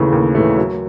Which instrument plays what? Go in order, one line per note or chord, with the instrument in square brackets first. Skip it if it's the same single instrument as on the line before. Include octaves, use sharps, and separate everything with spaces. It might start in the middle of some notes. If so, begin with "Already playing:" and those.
Already playing: [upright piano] D#2 C#3 E3 A3
D#2
C#3 E3 A3
F#3